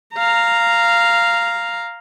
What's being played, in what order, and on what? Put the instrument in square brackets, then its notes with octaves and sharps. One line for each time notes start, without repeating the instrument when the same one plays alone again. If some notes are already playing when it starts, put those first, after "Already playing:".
[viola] F5 A#5